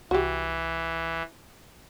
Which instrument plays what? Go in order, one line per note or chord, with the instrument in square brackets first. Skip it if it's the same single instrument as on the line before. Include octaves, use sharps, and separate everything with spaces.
[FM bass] C2 [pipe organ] E3 [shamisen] F#4 G4